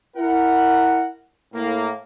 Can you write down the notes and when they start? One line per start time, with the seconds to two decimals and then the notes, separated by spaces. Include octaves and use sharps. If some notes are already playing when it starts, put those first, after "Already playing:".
0.17 E4 A#4 F#5
1.53 A2 A#3